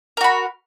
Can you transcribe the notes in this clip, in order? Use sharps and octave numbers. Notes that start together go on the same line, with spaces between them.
F#4 A#4 B5